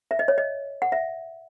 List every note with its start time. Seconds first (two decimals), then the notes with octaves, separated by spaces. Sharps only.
0.11 E5
0.19 D#5
0.28 C#5
0.38 D#5
0.82 F#5
0.92 E5